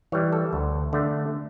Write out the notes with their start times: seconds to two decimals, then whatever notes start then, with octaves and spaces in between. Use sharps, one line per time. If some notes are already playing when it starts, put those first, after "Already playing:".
0.12 E3 G3 C#5
0.33 A4
0.53 D2
0.93 D3 A3